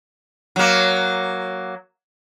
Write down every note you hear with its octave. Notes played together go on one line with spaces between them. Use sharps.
F#3 A#3